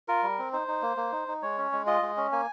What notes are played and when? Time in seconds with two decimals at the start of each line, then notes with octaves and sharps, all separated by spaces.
0.08 F4 A#4
0.23 G3
0.38 C4
0.53 D#4 C5
0.68 D#4
0.82 A#3
0.97 A#3
1.12 D#4
1.28 D#4
1.42 G#3 C#5
1.58 C#4
1.72 G#3
1.87 F4 D#5
2.02 G#3
2.17 C#4
2.32 A#3 G#5